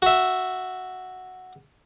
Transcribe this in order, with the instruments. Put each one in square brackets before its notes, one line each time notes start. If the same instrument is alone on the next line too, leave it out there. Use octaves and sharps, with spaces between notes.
[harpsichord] F#4 E5